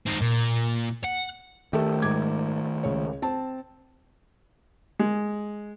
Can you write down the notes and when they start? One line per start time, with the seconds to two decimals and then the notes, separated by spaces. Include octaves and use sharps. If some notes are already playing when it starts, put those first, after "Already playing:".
0.06 C4 D#4
0.21 A#2
1.04 F#5
1.73 D#3 A3 G4 A4 E5
2.02 G#2 D6 G#6
2.84 C#2 C#5
3.22 C4 A5
4.99 G#3